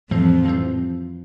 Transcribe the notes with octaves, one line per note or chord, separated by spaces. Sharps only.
F2 A2 E3 F3 G3 C4
A2 E3 G3 C4